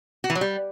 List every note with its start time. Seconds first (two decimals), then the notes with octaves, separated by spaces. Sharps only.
0.24 F#4
0.30 E3
0.35 F#3
0.41 G3